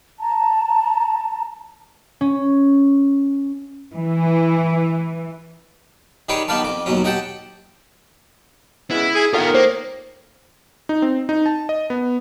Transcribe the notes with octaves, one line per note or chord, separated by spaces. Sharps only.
A5 A#5
C#4
E3
D#3 G4 G#4 B4 C#5 D5
D#3 B3 G4 B4 F5 A5
F2 D6
D#2 B2 F#3 C#4
G4 D#5 F#5 G5 A5
C#3 G#3 B3 E4
G#4
D#3 B3 F4 A4 A#4 F5
A#3 C5
D#4
C4
D#4
A5
D#5
B3